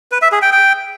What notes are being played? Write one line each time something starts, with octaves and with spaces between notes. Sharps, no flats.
B4
E5
G#4
G5
G5